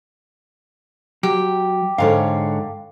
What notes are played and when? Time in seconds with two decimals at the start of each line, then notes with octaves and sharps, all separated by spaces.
1.23 F#3 G4
1.98 G#2 D3 C#5 F5